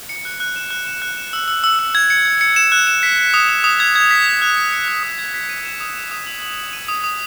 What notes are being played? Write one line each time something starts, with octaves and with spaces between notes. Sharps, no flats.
C#7
F#6
F#6
E7
F#6
E7
F#6
E7
E6
E6
E6
E6
G#6
C#7
G#6
C#7
E7
F#6
E7
B6
B6
D#6
D#6
D#6
G#6
G#6
B6
G#6
F#6
C#7
C#7
F#6
D#6
G#6
B6
D#7
E7
D#6
E7
D#6
F#7
F#7
F#7
D#7
D#6
D#6